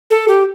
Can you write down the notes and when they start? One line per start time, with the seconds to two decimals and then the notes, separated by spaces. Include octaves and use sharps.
0.11 A4
0.28 G4